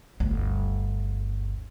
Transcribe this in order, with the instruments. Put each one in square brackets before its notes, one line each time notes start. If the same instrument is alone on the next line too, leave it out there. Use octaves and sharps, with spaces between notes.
[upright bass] G1 D2